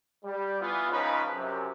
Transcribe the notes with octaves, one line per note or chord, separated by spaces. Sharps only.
G3
E3 B3 F4
C#2 C#3 F3 C#4 D#4 B4
F#2 C3